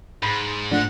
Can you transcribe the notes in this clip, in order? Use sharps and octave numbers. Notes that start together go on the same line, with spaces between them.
G#2 B5
F3 A3 D4 F#5